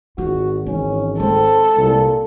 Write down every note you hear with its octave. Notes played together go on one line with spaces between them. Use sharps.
G#1 F4 F#4
G#1 E3 C#4
G#3 C4 A4
C2 A#2